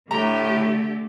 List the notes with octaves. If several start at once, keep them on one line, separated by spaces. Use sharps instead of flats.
A2 D3 A3 G4 A#5